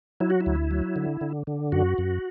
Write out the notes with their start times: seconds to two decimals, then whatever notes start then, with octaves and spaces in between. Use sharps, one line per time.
0.20 F#3 E4
0.30 F#4
0.41 E4
0.46 D2
0.71 F#3
0.96 D3
1.21 D3
1.47 D3
1.72 F#2 F#4
1.98 F#2